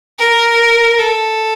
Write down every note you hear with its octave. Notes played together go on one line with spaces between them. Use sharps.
A#4
A4